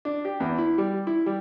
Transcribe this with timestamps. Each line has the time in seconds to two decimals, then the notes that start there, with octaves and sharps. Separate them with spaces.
0.05 D4
0.25 G4
0.40 E2
0.58 E4
0.78 G3
1.07 E4
1.26 G3